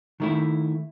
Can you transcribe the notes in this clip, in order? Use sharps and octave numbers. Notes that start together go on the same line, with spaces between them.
D#3 A3 E4